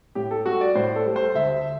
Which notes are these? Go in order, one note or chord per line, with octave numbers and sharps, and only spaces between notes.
A2 G4
A4
G3 F#4
D5
A2 C5
A4
G3
C5
D2 E5